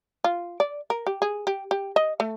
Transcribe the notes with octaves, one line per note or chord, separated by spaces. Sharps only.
F4
D5
A#4
G4
G#4
G4
G4
D#5
A3